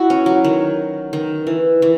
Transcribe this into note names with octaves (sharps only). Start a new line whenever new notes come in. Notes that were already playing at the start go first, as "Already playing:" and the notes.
Already playing: E4 F#4
C#4
F#3
D#3
D#3
E3
E3